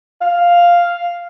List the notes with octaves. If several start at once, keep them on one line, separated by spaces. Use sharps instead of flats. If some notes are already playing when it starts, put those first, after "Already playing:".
F5